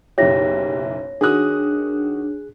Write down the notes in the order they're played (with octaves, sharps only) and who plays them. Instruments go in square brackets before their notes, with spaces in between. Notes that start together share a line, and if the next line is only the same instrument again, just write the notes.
[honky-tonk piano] F#1 B1 E4 [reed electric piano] G4 [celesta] C#5 A#6
[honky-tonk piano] D#3 F#4 D#6 [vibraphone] D4 [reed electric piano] G#4 F#6